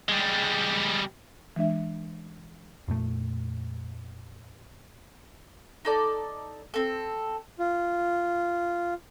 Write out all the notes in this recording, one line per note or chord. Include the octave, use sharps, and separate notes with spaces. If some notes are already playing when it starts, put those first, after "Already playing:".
G3 G#3
E3 G#3 D4 E5
F2 A#2 A3
D#4 A4 D5
C4 A4
F4